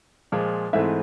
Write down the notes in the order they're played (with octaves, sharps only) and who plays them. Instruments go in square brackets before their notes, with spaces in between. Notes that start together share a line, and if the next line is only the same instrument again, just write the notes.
[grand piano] A#2 F3 G#3
G#2 E3 A3 C4 E5